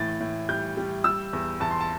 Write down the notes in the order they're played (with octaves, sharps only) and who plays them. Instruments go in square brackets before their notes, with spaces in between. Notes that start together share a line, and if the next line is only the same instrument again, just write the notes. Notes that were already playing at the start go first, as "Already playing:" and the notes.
Already playing: [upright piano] A2 E3 A6
A2
G3 G6
G3
G3 E6
E2
E2 A5
C6
A5